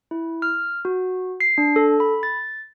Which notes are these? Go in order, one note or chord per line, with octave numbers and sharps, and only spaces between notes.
E4
F6
F#4
C7
D4
A4
B5
A6